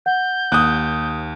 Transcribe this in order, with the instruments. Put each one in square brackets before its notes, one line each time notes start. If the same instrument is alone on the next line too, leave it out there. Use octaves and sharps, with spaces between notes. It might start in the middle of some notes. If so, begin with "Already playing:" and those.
[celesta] F#5 [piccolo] G6
[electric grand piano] D#2 [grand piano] D#6 F#6